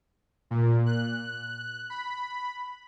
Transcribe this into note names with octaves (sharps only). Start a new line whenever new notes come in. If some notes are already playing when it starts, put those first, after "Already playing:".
A#2
F#6
B5